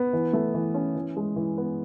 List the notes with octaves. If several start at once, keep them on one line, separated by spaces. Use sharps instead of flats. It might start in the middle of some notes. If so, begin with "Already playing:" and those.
Already playing: B3
E3
A3
E3
C#4
E3
G#3
E3
B3